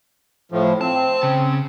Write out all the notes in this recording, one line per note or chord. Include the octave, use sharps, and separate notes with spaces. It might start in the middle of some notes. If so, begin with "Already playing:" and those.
A2 F3
C4 A5
C#3